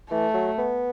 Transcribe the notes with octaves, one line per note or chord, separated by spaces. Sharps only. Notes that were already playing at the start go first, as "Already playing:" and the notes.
E3 A3
F#3
B3